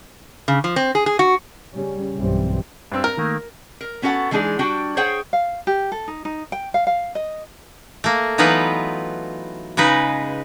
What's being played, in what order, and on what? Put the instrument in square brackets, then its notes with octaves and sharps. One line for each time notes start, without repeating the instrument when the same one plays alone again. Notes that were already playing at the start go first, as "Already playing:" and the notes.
[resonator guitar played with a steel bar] C#3
F3
C4
G#4
G#4
F#4
[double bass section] C#3 G3 C#4
B1 G2 E3 G3 C4
[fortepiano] G2 C4 E6
[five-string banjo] A#4 [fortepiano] A#5
[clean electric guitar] D#3 A3 A#3
[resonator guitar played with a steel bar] A#4
B3 C#4 F#4 A4 F#5
E3 G#3 D4 D#4 G#4
G3 D4 F#4 G5
G#4 C5 C#5 F#5 G5
[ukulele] F5
G4
A4
D#4
D#4
G5
F5
F5
D#5
[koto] A3 A#3
E3 F#3 B3 D#4 F4 B4
C#3 G#3 D#4 B4